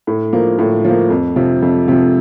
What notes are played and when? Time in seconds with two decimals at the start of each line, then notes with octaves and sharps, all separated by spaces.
0.07 A2
0.33 F3 A#3
0.59 A2
0.85 F3 A#3
1.10 F2
1.36 C3 F3
1.62 F2
1.88 C3 F3